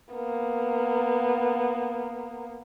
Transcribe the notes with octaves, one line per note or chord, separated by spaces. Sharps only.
A#3 B3